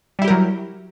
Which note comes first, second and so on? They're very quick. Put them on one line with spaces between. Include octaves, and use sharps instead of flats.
G3 E4 G4 A#4 F#3